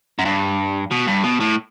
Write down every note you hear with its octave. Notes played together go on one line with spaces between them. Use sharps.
F#2
G2
B2
G2
B2
A2